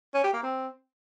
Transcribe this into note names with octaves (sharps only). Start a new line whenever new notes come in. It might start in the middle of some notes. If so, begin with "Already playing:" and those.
C#4
G4
A#3
C4